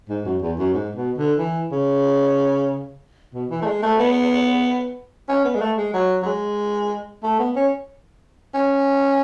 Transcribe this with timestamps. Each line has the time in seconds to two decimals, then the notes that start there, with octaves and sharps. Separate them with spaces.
0.09 G#2
0.25 F#2
0.42 E2
0.58 F#2
0.74 G#2
0.96 B2
1.18 D3
1.39 E3
1.72 C#3
3.34 B2
3.51 E3
3.62 A3
3.66 G#3
3.83 A3
3.99 B3
5.29 C#4
5.45 B3
5.55 G#3
5.61 A3
5.77 G#3
5.94 F#3
6.23 F#3
6.26 G#3
7.23 A3
7.39 B3
7.56 C#4
8.54 C#4